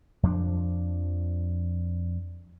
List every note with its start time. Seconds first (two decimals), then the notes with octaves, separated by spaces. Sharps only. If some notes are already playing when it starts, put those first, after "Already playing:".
0.23 F2 F3 A#3 D4